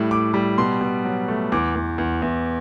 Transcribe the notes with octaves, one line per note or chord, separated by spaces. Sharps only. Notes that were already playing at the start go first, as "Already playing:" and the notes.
Already playing: A2 G3
A2 D6
G3
B2 C6
B2
F#3
A3
E2 D6
E2
E2
E2